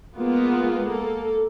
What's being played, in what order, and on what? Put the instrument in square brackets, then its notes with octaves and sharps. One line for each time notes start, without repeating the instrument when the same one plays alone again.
[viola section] G#3 A#3 B3 F4
A#3 A4